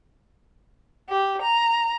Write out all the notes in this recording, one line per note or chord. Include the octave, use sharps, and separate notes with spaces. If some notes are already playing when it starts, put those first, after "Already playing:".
G4
A#5